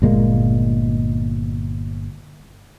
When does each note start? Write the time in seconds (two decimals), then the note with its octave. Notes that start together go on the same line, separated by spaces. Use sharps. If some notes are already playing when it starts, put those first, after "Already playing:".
0.02 G1 A#2 G#3 A#3